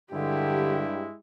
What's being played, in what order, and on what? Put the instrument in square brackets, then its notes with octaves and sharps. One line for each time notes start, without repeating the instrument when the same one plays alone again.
[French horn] G2 [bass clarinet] D3 [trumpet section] G#3 E4 [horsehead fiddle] G4